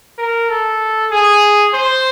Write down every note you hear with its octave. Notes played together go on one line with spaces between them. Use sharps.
A#4
A4
G#4
C5